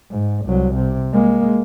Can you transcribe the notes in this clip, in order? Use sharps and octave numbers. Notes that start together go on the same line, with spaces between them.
G#2
C2 F#3
C3
G#3 A#3